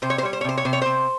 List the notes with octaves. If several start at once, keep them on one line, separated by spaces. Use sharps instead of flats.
C3 C5
C#5
C5
G3 C#5
C5
C#5
C3 C5
C#5
C3 C5
C#5
C3 C5